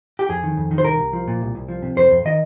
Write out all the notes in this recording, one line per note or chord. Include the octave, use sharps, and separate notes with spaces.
G4
F2 G#4
D#3
F2
D#3
C5
C2 A#4
C2
F3
A#2
C2
C2
F3
C3
F2 C5
F2
D#3 D#5